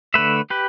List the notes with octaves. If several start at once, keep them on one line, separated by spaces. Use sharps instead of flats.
D3 A3 B4 E5
G4 B4